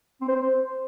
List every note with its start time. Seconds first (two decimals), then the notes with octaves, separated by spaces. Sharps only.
0.21 C4
0.28 C5
0.35 C4
0.42 C5